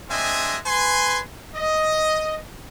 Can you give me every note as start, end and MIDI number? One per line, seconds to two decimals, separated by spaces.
0.10 0.58 56
0.10 0.58 60
0.10 0.58 62
0.10 0.58 75
0.10 0.58 76
0.10 0.58 80
0.66 1.20 71
0.66 1.20 80
0.66 1.20 84
1.55 2.38 75